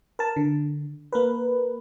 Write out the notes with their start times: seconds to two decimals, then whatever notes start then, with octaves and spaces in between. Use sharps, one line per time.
0.19 A#4 A5
0.36 D3
1.12 A#3 A#4 B4